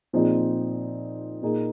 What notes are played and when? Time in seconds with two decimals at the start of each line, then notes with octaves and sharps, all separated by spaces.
0.13 A#2 F3 C4 D#4 G#4
1.42 A#2 A#3 D#4 G#4